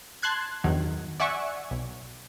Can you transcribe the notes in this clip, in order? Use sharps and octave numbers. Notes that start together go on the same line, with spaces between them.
A5 C6 F#6 G#6
E2 G2 D#3 F#3
D5 E5 F#5 G#5 C#6
B1